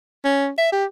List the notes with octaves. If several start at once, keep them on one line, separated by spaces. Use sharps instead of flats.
C#4
E5
G4